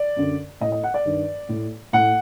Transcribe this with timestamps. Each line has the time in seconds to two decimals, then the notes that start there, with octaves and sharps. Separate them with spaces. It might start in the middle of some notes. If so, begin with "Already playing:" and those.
Already playing: D5
0.16 F#2 D3
0.61 A2 D#5
0.72 D#5
0.83 F#5
0.94 D5
1.05 G2 D#3
1.49 A2
1.93 A2 F#5